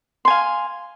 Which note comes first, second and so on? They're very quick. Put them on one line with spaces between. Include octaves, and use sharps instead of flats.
C6 G#5 F5